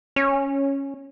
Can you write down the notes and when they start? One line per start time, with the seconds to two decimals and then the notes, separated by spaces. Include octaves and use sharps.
0.16 C#4